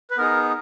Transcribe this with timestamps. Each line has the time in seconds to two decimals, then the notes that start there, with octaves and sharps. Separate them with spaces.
0.11 B4
0.18 B3 D#4 G#4 A#4